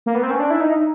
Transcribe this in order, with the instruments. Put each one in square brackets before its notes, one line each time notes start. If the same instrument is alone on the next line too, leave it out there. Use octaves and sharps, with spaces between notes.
[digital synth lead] A#3
B3
C4
C#4
D4
E4
D#4